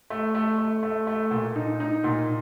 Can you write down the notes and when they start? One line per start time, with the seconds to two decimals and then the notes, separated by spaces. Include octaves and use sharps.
0.10 A3
0.35 A3
0.58 A3
0.83 A3
1.07 A3
1.31 A#2
1.56 D#4
1.80 D#4
2.04 A#2